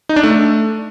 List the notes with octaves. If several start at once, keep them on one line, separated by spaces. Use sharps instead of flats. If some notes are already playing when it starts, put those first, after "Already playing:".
D#4
D4
A3